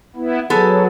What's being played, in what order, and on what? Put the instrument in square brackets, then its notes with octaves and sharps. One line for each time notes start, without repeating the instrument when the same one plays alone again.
[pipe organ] B3 E4
[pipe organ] F#3 [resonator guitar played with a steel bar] B3 G#4 A4